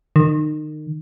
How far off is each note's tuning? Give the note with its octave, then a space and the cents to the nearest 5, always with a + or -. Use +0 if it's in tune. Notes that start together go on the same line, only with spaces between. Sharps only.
D#3 -30